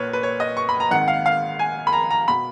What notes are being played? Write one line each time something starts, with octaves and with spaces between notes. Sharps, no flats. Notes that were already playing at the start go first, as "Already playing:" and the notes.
Already playing: A#1 A#2 B4 C#5
B4
C#5
D#5
C#6
B5
A#5
G#1 G#2 D#3 F#5
F5
F5
G#5
B5
A#5
A#5
B2 B5